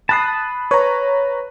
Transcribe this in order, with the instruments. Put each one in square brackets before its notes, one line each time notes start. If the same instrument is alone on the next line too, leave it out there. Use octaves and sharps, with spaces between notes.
[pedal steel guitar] A5 D#6 [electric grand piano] B5 F#6 C7
[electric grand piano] B4 A#5 [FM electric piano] C#5